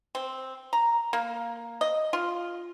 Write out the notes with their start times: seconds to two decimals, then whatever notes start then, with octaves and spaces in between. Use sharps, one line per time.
0.15 C4
0.73 A#5
1.13 A#3
1.81 D#5
2.13 F4